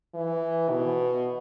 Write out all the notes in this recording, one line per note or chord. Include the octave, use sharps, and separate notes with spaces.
E3
B2